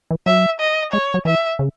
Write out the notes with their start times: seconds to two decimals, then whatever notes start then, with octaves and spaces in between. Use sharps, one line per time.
0.11 E3
0.26 F#3 E5
0.60 D#5
0.92 G#3 C#5
1.14 F#3
1.25 E3 E5
1.59 C#3